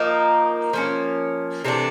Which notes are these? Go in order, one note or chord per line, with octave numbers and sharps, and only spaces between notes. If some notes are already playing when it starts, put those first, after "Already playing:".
Already playing: F3 A#3 D#4
F3 A#3 C#4
C3 E3 A3 D4